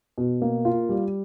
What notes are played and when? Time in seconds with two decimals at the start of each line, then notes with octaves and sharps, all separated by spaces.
0.18 B2
0.42 A#3
0.65 F4
0.89 G3